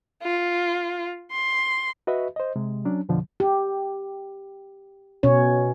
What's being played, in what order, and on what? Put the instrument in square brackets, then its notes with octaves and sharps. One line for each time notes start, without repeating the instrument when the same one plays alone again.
[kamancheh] F4
C6
[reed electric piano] F#4 B4 D#5 E5
C5 D#5
C3 G#3
F#3 C#4 D4
F2 B2 D3 F3
[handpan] G4
B2 C#4 C#5